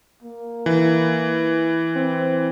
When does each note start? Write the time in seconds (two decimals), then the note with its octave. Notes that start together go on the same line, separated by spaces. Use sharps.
0.23 A#3
0.66 E3
1.95 C4